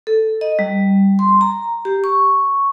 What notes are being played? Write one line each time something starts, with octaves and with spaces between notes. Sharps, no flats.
A4
D#5
G3
C6
A#5
G4
C#6